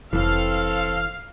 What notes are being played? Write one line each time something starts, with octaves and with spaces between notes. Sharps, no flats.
F1 E3 C4 A4 F5